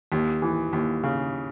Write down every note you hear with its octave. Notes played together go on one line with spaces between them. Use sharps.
D#2
E3
D#2
C#3